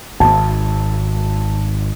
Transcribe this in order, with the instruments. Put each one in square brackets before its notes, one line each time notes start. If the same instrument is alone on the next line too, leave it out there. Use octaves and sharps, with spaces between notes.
[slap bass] G#1 [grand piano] A5